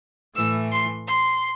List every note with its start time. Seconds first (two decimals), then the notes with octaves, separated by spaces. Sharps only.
0.36 A2 E3 A3 E6
0.72 C6
1.07 C6